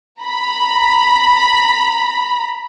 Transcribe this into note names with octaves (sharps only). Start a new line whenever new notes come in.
A#5 B5